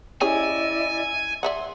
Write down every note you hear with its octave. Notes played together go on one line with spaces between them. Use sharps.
C#4 E4 G4 G#4 D5 D#5 G#5
D5 E5 F#5 C6